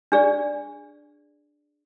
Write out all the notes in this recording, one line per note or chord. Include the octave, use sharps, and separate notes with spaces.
D4 G#4 D5